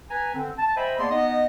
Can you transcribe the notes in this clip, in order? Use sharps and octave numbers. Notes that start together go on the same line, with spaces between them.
B4 G#5 A#5
D3 C4
A5
C5 D#5 E5 G5 G#5 B5
A#3 B3 G#4 D5 A5 C6
B3 D#4 D#5